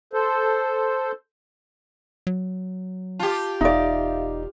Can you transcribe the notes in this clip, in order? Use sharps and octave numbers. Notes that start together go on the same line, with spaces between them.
A4 C5
F#3
F4 G4 A5
E1 D#4 D5 E5 F5